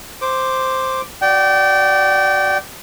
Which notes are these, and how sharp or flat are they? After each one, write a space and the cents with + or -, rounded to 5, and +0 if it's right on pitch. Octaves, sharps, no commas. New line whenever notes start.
C5 +0 D6 +0
F#4 +0 D5 +0 G5 -25